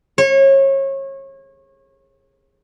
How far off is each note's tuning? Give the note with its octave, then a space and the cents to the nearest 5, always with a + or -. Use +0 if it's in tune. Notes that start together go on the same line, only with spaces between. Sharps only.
C#5 -30